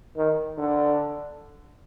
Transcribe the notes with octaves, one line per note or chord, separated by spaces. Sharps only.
D#3
D3